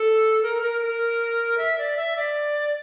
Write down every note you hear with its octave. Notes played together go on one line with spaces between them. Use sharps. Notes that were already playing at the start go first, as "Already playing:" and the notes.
Already playing: A4
A#4
A#4
A#4
E5
D5
E5
D5